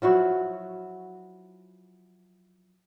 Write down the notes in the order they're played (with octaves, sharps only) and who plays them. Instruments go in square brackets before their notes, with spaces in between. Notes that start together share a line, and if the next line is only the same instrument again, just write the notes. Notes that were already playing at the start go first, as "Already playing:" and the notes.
[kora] F3 F#3 E4 F#4